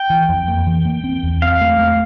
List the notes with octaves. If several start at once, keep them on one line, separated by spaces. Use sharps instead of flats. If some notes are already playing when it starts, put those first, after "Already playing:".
Already playing: G5
E3
F2
A#3
E3
A#3
C4
E2
C4 F5
A3
A3